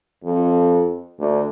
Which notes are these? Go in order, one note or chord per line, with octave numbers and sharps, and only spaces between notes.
F2
D2